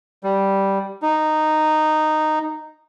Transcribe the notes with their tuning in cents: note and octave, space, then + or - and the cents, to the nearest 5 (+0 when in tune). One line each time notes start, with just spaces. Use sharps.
G3 -5
D#4 -10